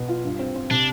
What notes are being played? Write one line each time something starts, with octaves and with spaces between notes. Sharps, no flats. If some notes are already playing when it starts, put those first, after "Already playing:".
Already playing: B2 B3
F4
G2
C4
C4
C3 D4